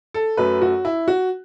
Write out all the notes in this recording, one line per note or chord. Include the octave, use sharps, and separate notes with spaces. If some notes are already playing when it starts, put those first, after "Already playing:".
A4
F#2 F#3 A3 B4
F#4
E4
F#4